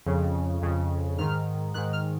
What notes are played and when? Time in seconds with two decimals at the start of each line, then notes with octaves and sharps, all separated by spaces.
0.06 F2 C#3
0.62 F2 C#3
1.18 G#2 D#3 F6
1.74 G#2 D#3 F#6
1.93 F6